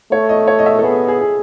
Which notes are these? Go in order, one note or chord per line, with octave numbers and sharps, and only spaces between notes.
A3 C#5
D#5
C#5
D#5
E5
A4
B3 G#4
G#4
G#4